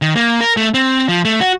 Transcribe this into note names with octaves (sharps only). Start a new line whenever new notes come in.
D#3
A#3
A#4
A3
C4
F3
A3
F#4